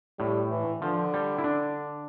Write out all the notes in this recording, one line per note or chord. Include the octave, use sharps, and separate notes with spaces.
A2 G3
E3
D3 F3
G3
E4
D4